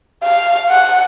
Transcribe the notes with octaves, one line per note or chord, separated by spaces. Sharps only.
F5
F#5